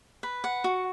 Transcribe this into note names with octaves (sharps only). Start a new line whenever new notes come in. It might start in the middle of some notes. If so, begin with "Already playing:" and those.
B4
F#5
F#4